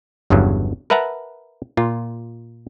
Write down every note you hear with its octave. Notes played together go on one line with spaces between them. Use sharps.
G1 E2 G2 C#3 F#3
A#4 B4 E5 F#5 A5 A#5
A#2 F4